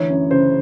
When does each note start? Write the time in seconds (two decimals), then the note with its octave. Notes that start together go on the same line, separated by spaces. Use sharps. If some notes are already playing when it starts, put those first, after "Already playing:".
Already playing: D2 E3 C#5
0.09 F#2
0.31 C#3 C5